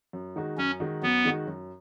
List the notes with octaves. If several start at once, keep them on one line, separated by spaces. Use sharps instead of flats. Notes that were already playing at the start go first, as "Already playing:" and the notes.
F#2
D#3 G#3 D#4 F#4
F#2 C#4
D#3 G#3 D#4 F#4
F#2 B3
D#3 G#3 D#4 F#4
F#2